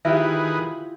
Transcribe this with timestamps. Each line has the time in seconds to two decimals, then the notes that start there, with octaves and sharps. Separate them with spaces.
0.05 D#3 E4 F4 G4 G#4 B4 E5